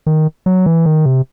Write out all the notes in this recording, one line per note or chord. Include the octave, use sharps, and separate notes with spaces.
D#3
F#3
E3
D#3
C3